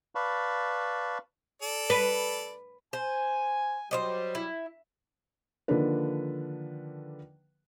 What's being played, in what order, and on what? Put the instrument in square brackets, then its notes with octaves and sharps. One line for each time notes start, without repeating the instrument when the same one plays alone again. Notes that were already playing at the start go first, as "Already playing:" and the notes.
[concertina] B4 D5 F5 A5 B5 C#6
[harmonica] A4 D5
[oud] B4
[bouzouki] C5 [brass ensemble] G#5
[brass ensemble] F#3 G3 [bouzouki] C5 C#5 D#5
[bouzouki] E4
[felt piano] D3 D#3 F3 A#3 D4 B4